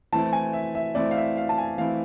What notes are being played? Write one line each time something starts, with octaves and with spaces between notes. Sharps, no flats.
E3 A3 C4 E4 A5
G#5
E5
E5
E3 A3 C4 E4 D5
F5
E5
F5
A5
G#5
E3 A3 C4 E4 F5